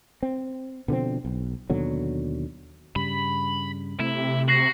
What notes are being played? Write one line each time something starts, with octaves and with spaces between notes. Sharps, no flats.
C4
B2 D3 F3 C4
B1
D#2 B2 D3 F#3
G2 C#3 G3 B5
C3 A3 E4
F#4 A#6 C7 F#7